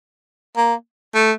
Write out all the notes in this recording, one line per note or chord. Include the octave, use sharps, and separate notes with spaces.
A#3
A3